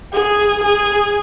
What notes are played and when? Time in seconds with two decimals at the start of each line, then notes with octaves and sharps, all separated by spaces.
0.14 G#4
0.63 G#4